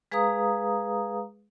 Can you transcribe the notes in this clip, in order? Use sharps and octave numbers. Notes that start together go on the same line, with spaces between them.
G#3 G#4 B4 F5 A#5 D#6